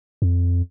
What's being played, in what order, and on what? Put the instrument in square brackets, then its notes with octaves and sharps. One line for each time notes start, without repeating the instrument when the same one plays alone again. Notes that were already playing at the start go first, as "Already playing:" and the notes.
[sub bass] F2